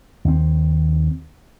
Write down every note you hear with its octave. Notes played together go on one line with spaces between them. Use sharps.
D#2 C4